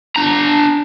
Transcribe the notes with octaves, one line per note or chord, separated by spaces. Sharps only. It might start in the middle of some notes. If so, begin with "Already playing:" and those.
D4 A#5